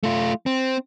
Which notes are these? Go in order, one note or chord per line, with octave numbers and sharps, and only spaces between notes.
A3 F4
C4